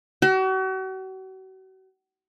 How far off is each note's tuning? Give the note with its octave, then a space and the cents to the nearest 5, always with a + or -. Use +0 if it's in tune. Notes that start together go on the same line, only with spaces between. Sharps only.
F#4 +40